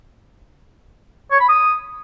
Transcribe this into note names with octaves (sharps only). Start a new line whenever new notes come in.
C#5
B5
D#6